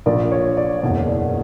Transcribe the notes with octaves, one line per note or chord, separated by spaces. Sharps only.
A#1 A#2 A#3 D5
C#5
D5
F#1 E2 B2 C#5
D5